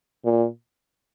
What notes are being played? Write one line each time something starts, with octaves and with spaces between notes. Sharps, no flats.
A#2